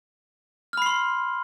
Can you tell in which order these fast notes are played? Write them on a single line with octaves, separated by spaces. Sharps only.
F6 B5 C7 C6